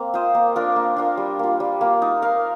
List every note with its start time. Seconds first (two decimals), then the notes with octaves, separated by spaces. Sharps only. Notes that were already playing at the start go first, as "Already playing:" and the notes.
Already playing: A#3 C4
0.14 F4 C5 D#5
0.35 A#3
0.56 D4 F4 A#4
0.76 A#3
0.96 D4 F4 A#4
1.17 G3
1.39 A#3 F4
1.60 G3
1.81 A#3 F4
2.02 D#4
2.22 A#4 F5